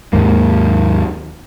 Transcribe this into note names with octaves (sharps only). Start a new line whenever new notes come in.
D#2 G#2 A#3